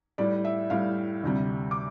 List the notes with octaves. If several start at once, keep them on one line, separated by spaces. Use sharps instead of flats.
A2 G3 D5
E5
A2 G3 F5
D2 C3 G3
D6